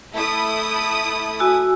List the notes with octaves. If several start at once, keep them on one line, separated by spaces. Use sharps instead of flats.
A3 E4 D#6
F#4 G#5 E6